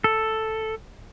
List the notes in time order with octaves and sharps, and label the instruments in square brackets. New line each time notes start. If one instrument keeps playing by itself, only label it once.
[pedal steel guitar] A4